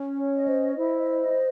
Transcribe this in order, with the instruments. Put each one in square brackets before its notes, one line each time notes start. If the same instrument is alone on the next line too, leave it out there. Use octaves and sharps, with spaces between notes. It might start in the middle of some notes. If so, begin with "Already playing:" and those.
Already playing: [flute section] C#4
[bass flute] C#5
[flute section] D#5
[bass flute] C5
[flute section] E4 [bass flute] C5
[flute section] D#5